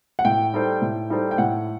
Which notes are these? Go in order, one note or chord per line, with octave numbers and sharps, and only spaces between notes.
F#5
A2 G5
G3 D#4 A4 C5
A2
G3 D#4 A4 C5
G5
A2 F#5